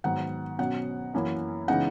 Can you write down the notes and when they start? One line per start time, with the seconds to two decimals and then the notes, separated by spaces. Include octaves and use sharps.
0.04 G#2 D#3 F#3 B3 F#5
0.59 B2 F#3 C#4 F#5
1.14 F#2 E3 A#3 C#4 E4
1.68 C#3 E3 G#3 B3 D#4 F#5